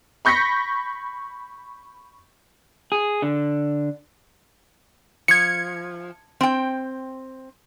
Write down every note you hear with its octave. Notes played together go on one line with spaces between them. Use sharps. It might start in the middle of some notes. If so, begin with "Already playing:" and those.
B5 C#6 G6 A#6 B6 C#7
G#4
D3
F3 G#6 C#7
C4 G5